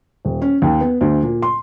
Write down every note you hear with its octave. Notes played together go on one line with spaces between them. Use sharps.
D#1
C#4
D#2
B3
D2
A#2
C6